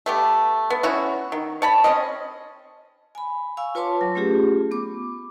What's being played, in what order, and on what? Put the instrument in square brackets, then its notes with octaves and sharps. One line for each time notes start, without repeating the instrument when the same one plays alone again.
[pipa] A3 B3 G4
B3
B3 C#4 E4 F#4
D#3
C#5 A5 B5
C4 C#4 D#5
[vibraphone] G#5 B5
F5 G#5 C#6 E6
F4 B4 C#5 A5 C6 D6
F#3
A3 C#4 F4 G4 G#4
B3 D6